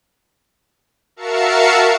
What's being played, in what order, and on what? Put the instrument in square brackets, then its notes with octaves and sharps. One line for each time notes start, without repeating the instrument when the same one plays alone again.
[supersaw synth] F#4 A#4 E5 F5 A5 C#7